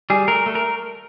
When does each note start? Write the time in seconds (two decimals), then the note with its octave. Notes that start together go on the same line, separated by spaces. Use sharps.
0.10 G3 G#4
0.28 A3 A#4
0.46 A3
0.55 A#4